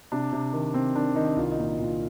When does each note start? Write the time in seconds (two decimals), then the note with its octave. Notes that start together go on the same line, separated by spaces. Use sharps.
0.12 C3 D4
0.33 C3
0.53 D#3
0.74 C3 C4
0.95 D#3 D4
1.16 D#3 D#4
1.36 C2 F4
1.52 D#4
1.58 A#2
1.68 D#4
1.79 A#2 F4